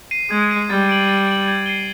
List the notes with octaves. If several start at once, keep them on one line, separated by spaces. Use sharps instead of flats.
C7 D#7
G#3 G#6
C7 D#7
G3 A6
D7 F#7
A6
D7 F#7
G#6
C7 D#7 G7